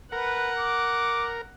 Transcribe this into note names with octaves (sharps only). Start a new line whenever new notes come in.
A#4 B4 F#5
D6